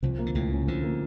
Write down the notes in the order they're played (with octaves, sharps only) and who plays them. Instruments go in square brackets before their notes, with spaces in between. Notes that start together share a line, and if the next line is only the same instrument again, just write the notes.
[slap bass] C2 C3 [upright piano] F3
[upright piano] A#3
[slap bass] D3
[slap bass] C#2 C#3 [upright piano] A2
[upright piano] C#4
[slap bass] D2 D3 [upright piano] F3
[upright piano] A#3